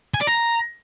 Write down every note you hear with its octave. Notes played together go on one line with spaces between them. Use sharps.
G#5
D5
A#5